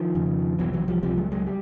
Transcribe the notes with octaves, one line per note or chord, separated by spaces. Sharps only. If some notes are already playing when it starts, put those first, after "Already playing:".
Already playing: D#3 F3
F2 C#3
C2 B2 E3 F#3
E3 F#3
F3 G3
C#2 C3 F3 G3
F#3 G#3
F#3 G#3
G3